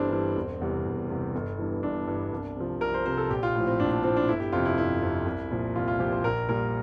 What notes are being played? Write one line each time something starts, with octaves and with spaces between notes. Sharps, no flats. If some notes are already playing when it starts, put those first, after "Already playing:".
Already playing: G1 G2 E3 G3 C4 D4
G2 E3 G3
E1
E2 C3 G3
E1
E2 C3 G3
G1
G2 E3
G1 D4
G2 E3
C2
C3 F3
C2 A#4
C5
C3 F3 C5
A4
A#1 G4
F4
A2 F3
C4
A#1 D4
D4
A2 F3 C4
D4
G1 E4
G4
F2 C3 F4
E4
G1 E4
F2 C3
C2
A#2 F3
C2 F4
F4
A#2 F3 G4
C5
A#1 A#4
A#2 G3 A#4